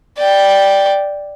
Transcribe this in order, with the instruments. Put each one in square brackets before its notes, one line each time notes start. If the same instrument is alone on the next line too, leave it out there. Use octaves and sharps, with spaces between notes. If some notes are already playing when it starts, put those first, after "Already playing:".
[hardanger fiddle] D5 G5